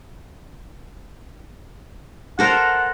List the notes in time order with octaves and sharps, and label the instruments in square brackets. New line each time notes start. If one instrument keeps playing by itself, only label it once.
[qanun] A4 A#4 C5 [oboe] F#5